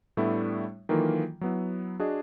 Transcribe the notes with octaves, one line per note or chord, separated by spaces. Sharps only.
A2 G3 A3 B3 D4 E4
D#3 E3 F#3 A#3 F4 A4
F#3 B3 E4
D4 F#4 G#4 D#5